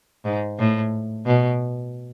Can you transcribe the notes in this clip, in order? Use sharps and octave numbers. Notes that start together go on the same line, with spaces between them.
G#2
A2
B2